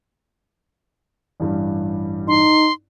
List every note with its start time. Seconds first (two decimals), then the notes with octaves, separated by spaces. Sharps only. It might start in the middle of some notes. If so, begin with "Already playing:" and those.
1.40 A1 G2 G3
2.28 D#4 C6